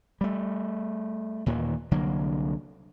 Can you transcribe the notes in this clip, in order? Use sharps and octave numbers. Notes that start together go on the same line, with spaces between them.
G3 A3
D#2 A#2 D#3 E3
C2 D3 F#3 A#3